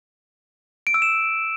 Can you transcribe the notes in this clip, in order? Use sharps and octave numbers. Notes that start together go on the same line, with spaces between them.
D7
E6
E7